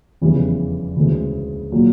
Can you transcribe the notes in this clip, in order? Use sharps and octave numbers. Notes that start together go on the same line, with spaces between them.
F1 E2 C#3 E3 G3
D2 C#3 E3 G#3
A#2 F#3 A#3